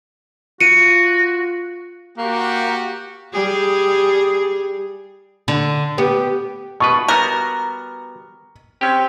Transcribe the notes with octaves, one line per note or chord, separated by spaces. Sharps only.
F4 F#4 C#7 D#7
A#3 F#4 G4
G3 G#4
D3
B3 G4
B2 F4 B4 C#6
G3 B3 F#4 A#4
C4 C#4 G4